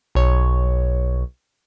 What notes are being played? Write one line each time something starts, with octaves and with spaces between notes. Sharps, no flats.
B1 C#5